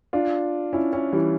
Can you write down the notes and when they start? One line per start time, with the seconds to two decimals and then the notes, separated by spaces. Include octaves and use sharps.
0.13 D4 F4
0.73 C#4 E4
0.93 C#4 E4
1.13 E3 G3